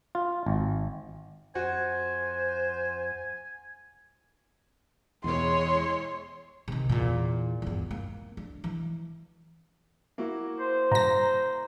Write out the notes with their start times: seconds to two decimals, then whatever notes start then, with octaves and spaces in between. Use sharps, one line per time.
0.15 F4
0.46 G#1
1.55 F2 F#4 C5 G#5
5.24 E2 B2 G#3 E4 C#5 C6
6.68 C3 D#3
6.89 E2 A#2
7.62 E2 G2
7.91 A#3
8.37 D4
8.64 E3
10.18 A#3 E4 F#4
10.59 C5
10.91 G2 A#5 A#6